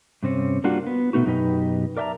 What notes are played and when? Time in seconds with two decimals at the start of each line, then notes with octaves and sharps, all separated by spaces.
0.23 G2 C3 C4 C#4
0.64 G3 A#3 D4 F4 F#4
0.87 B3
1.13 B2 A3 B3 D#4 F#4
1.26 F#2 B2 D#4 G4 B4 D#5
1.97 A#4 D5 E5 G5 A5 A#5